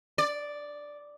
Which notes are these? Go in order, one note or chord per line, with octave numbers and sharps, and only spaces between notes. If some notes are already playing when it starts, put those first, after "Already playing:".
D5